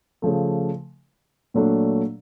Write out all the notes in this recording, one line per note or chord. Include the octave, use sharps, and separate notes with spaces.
C#3 F3 A3
A#2 F#3 A3 D4